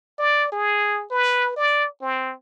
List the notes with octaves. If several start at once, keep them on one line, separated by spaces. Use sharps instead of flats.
D5
G#4
B4
D5
C4